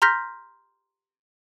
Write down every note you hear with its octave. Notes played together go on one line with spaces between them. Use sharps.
A#5 C6 F6 G6 A#6 B6